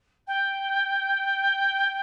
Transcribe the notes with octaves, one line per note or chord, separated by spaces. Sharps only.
G5